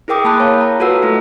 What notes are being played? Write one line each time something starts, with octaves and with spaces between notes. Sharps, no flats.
E4 G#4 A#4 G5 D6 D#6
A#3 A5 B5 D#6 F#6
C#5 F5
A#5
F4 F#4 A4 B4 F#5 E6
A3 E4